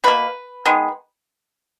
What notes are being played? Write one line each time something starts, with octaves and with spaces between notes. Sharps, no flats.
B2 A#3 B4
D#3 G#3 B3